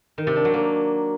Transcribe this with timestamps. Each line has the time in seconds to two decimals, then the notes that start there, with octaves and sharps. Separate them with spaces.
0.18 D#3
0.27 C3
0.36 D4
0.45 F#3
0.54 A#3